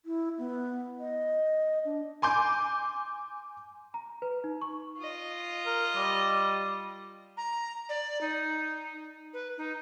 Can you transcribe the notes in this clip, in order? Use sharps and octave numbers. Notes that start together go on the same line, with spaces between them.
E4
B3
D#5
D4
G#5 C6 D6 G6
A#5
B4
D#4
C#6
F4 D#5
A#4
G3
A#5
D5
D#4
B4
D#4